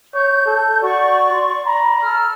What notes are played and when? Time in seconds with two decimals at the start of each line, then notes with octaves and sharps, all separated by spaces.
0.14 C#5 G6
0.46 A4
0.82 F#4 D5 C#6
1.32 C6
1.65 A#5 B5
2.02 A4 F6